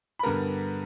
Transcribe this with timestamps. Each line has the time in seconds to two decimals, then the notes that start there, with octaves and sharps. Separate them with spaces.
0.19 B5
0.23 G2 D3 G3 B3 A#4 A#5